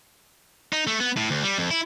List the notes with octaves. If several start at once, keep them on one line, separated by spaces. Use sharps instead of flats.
D#4
A3
B3
A2
D2
G3
F2
E4